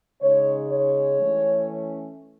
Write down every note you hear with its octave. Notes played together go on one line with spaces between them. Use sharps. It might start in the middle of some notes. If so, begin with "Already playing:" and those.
C#3 G#3 D#4 C#5
C#5
E3 A3 C#4